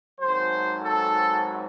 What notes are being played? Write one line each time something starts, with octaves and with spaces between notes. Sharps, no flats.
G#1 G#2 F#3 C5
A4